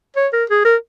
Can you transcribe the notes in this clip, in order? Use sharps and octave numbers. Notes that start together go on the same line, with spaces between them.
C#5
A#4
G#4
A#4